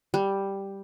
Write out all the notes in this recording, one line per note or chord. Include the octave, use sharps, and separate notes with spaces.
G3